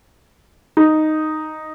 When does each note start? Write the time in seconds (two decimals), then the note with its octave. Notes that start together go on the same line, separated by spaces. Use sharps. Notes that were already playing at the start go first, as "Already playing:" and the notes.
0.77 D#4